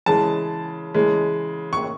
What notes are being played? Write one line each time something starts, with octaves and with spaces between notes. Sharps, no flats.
C#3 E3 G#3 A5
C#3 E3 G#3
C#6